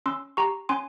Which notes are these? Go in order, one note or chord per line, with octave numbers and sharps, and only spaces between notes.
C#4 C6 E6
G4 A#5 C#6
C#4 G#5 C6